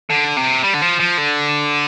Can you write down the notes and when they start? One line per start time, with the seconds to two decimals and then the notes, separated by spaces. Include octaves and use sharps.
0.10 D3
0.37 C3
0.64 G3
0.74 D3
0.82 F3
1.00 F3
1.18 D3